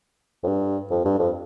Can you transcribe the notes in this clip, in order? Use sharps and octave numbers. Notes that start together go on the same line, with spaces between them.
F2
G2
F2
G2
F2